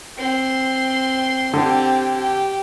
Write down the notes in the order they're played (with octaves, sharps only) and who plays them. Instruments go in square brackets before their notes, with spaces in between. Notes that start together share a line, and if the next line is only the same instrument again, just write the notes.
[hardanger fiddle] C4 C6
[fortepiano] D3 [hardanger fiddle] C4 G4
[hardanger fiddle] G4